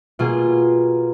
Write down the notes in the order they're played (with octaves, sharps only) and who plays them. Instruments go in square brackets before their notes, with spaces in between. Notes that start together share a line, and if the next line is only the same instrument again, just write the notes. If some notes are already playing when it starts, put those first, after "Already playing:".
[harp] B2 A#3 F4 G#4